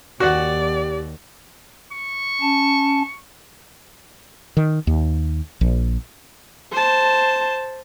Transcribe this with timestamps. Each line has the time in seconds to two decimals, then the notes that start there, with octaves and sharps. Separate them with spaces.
0.20 D#2 F#4 G4 D5 F#5
1.92 C#6
2.41 C#4 A5
4.57 D#3
4.87 D#2
5.61 A#1
6.72 C5 A5